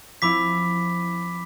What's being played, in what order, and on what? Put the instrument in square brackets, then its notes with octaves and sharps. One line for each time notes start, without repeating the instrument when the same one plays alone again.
[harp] F3 C4 E4 [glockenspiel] B5 D6 B6